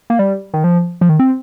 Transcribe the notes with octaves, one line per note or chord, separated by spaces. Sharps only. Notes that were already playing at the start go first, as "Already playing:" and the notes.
A#3
G3
D#3
F3
F3
D#3
C4